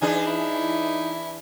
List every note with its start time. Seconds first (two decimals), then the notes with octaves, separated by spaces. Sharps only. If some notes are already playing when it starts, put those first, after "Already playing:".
0.02 E3 D4 D#4 G#4 G#5
0.27 E4